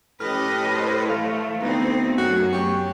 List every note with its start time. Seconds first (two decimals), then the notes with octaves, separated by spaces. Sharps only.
0.20 A2 C#4 G4 B4 D#5 F6
0.71 A4 C5
1.10 E3 A3 F5
1.62 D2 A3 B3 C4 D#4
2.18 F#2 F#4
2.53 G4 C#6